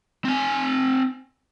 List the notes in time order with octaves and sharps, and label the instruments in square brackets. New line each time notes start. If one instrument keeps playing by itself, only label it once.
[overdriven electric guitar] C4 G#5